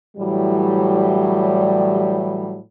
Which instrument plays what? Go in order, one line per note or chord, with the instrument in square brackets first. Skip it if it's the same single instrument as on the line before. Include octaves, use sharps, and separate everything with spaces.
[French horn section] A2 E3 F#3 G3